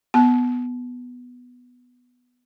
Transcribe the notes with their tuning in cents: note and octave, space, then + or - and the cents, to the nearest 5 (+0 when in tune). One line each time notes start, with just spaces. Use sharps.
B3 +0 A5 -30